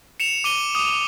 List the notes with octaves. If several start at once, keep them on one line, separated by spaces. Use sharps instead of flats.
C#7 E7 F7
D6 D#7 G7
D6 D#6